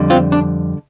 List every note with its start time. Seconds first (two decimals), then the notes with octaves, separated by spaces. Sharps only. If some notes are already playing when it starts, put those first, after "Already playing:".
Already playing: F2 D3 G3
0.10 C4 F4
0.32 D4